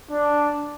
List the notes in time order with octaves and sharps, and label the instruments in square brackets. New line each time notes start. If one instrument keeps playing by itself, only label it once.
[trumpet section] D4